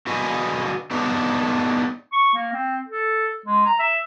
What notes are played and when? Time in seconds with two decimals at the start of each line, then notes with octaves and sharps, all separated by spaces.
0.07 D3 F#4 B4 D#5 G#5
0.91 A3 B3 D4 D#4 G4 B4
2.12 C#6
2.34 A#3
2.53 C4
2.88 A4
3.46 G#3
3.66 A#5
3.79 E5